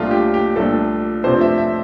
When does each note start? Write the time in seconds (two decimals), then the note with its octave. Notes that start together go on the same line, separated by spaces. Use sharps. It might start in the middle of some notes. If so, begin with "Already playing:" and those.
Already playing: C2 A#2 A3 D4 F4
0.11 G4
0.34 G4
0.56 C2 A#2 A3 D4 A4
1.24 F2 C3 F3 A3 D4 C5
1.41 E5
1.58 E5